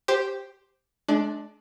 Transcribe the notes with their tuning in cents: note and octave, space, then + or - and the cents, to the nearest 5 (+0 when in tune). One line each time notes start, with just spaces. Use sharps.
G4 +0 C5 +0
G#3 +40 D4 +5